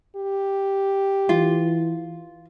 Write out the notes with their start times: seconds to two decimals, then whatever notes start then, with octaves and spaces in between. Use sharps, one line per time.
0.16 G4
1.29 E3 F4